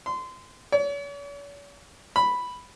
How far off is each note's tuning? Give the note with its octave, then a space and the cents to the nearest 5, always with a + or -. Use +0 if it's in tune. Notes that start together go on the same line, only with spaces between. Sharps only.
C6 -25
C#5 +45
B5 +0